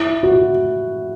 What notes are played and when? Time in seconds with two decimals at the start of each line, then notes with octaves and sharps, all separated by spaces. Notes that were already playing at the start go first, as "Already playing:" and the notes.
Already playing: E4
0.23 F#4